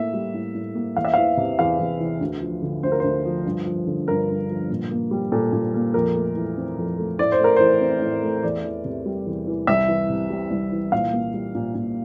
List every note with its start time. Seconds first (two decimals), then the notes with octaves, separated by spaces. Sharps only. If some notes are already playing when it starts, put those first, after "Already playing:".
Already playing: A2 A#3 E5
0.14 G3
0.34 A2
0.54 A2
0.75 A#3
0.96 E2 F5
1.05 E5
1.14 E3 F5
1.37 C3
1.59 E2 F5
1.79 E2
2.00 E3
2.21 D2
2.42 F3
2.62 D3
2.83 D2 C5
2.92 A#4
3.00 D2 C5
3.25 F3
3.46 G2
3.66 F3
3.87 D3
4.08 G2 A#4
4.28 G2
4.49 F3
4.70 A#2
4.91 A#3
5.11 G3
5.32 A#2 A4
5.53 A#2
5.74 A#3
5.94 F2 A#4
6.15 A3
6.36 E3
6.57 C4
6.77 F2
6.98 A3
7.19 A2 D5
7.32 C5
7.40 A3 A#4
7.56 E3 C5
7.81 C4
8.02 A2
8.23 A3
8.43 E2 D5
8.64 E3
8.85 C3
9.06 G3
9.26 E2
9.47 E3
9.67 C2 E5
9.88 E3
10.10 C3
10.30 G3
10.51 C2
10.72 E3
10.92 A#2 F5
11.13 A#3
11.34 G3
11.55 A#2
11.75 A#2